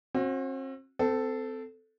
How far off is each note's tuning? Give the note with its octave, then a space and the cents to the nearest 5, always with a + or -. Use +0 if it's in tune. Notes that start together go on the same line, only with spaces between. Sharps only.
C4 +40 F#4 -25
C4 -25 A4 +0